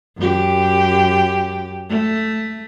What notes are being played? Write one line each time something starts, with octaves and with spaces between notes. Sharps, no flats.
F#2 G4
A3